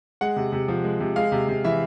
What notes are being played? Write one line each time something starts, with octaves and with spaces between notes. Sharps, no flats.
G#3 F#5
C3
C3
F3
G#3
C3
G#3 F5
C3
C3
E3 E5